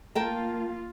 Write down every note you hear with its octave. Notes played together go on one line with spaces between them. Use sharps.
A#3 F4 A#4 G5 A5